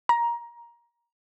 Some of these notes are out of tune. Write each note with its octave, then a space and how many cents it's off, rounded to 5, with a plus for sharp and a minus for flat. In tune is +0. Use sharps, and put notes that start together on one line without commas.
A#5 +15